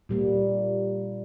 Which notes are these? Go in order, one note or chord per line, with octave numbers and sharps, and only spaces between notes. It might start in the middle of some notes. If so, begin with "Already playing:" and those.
A#2 G3 A#3